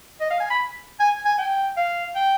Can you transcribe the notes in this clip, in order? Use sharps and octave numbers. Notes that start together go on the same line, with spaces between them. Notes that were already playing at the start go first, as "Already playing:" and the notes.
D#5
F5
G#5
B5
G#5
G#5
G5
F5
G5